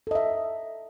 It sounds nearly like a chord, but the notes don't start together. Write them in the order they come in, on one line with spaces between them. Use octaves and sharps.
A4 D#5 E5